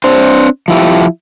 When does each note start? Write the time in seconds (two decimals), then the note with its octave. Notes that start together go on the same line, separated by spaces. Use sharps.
0.04 C4 D4 C5
0.68 F3 E4 G4